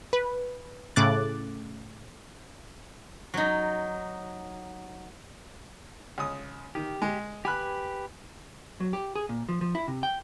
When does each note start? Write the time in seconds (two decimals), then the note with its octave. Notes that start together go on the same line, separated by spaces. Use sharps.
0.13 B4
0.96 A2 C#3 D6 F#6 A6
3.34 F#3 D#4
6.18 C#2 D#6
6.75 D#3 G4
7.02 G#3
7.45 G4 B4 G#5 B5 F#6
8.80 F#3
8.93 G4
9.15 G#4
9.29 A#2
9.49 F3
9.61 F3
9.75 E4
9.88 C3
10.03 G5